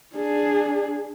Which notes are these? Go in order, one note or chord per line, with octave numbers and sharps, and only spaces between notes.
D4 G#4